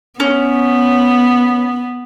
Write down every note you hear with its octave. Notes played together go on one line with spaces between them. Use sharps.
B3 C#4